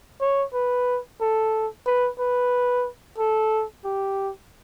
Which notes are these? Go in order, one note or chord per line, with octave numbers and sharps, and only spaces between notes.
C#5
B4
A4
B4
B4
A4
G4